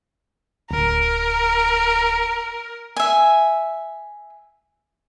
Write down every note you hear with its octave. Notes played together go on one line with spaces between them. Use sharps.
D1 A#4
E5 G#5